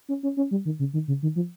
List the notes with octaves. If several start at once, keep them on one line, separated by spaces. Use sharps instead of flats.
C#4
C#4
C#4
G3
D#3
C#3
D#3
C#3
D#3
F3